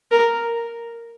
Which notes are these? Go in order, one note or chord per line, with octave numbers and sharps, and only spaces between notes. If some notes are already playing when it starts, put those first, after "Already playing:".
A#4